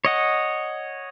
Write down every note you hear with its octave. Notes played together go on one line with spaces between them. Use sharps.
C#5 D#5 F#5